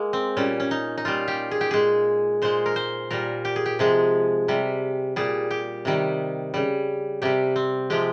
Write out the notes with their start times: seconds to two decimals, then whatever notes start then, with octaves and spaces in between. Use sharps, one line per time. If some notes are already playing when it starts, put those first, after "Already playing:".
Already playing: G#3 A#3
0.13 C4
0.37 A#2 G3 C#4
0.60 C#4
0.71 D#4
0.98 D#4
1.05 A#2 G3 F4
1.28 G4
1.51 G#4
1.61 G4
1.71 A#2 G#3 G#4
2.42 A#2 G#3 C5
2.66 A#4
2.76 C5
3.10 A#2 G3 A#4
3.45 G4
3.56 G#4
3.66 G4
3.79 C3 F3 G#3 G#4
4.48 C3 G3
5.16 A#2 G3 G#4
5.51 G4
5.85 C3 D#3 G3
6.54 C#3 G3
7.22 C3 G3 G4
7.56 C4
7.90 C3 F3 G#3 G4